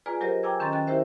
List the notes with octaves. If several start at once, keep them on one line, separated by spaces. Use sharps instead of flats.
F4 G#4 B4 D5 G#5 A#5
F#3 G4 A#4 C5 D#5
G5 G#5 A#5 D6 E6 G#6
D#3 C#4 D#5 A#5 C6 A6
G5 F#6 A6
E4 G4 A#4 C5 E5